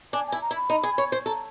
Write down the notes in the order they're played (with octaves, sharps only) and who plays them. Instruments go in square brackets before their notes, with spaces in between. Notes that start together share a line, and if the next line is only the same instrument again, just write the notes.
[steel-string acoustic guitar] D4 [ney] G#5
[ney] G#5
[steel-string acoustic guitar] E4
[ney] A#5
[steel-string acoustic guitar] E4
[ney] B5
[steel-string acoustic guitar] D#4
G#4
C#5
C5
[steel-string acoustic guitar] A4 [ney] A#5